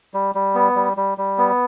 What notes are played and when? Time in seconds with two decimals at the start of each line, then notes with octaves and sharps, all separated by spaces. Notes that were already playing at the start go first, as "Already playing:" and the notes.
0.14 G3
0.35 G3
0.55 B3
0.76 G3
0.97 G3
1.18 G3
1.38 B3